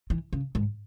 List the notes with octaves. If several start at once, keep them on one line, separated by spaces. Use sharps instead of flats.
E3
C#3
G#2